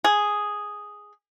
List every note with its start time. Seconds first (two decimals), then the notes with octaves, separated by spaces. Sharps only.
0.04 G#4